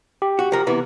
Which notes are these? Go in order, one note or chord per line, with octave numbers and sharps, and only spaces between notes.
G4
F#4
F3 A#4
C3 E3 B3